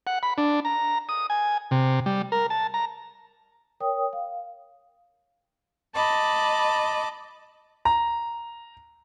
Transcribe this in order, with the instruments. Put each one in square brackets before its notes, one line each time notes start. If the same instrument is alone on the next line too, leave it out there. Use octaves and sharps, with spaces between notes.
[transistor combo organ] F#5
B5
D4
A#5
D#6
G#5
C3
G3
A#4
A5
A#5
[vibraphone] A#4 C#5 G5 D#6
F5
[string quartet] D#5 A5 B5 D6
[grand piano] A#5